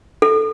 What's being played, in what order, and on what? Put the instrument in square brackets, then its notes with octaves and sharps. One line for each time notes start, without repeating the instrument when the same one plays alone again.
[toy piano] A4